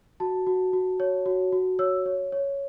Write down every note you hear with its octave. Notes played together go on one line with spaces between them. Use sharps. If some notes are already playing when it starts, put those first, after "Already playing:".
F#4 A5
F#4
F#4
C#5
F#4
F#4
C#5 E6
C#5
C#5